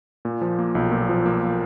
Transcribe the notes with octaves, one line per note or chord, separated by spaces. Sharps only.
A#2
F3
A#3
B1
A#2
F3
A#3